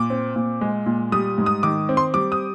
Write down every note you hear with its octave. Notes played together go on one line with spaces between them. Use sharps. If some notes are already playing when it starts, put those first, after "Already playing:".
Already playing: A#2 D6
C4
A#2
G#3
A#2
G3 D#6
G#2
D#6
D#3 D6
C4
C6
G3 D6
D#6